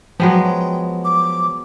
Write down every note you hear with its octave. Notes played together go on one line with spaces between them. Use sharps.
F3 F#3 G#3 B3 G5
D6